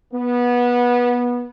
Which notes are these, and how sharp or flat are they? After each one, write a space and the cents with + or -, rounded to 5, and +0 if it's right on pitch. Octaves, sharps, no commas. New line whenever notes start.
B3 -20